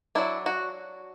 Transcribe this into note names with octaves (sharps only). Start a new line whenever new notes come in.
F#3 D4 E4
F#4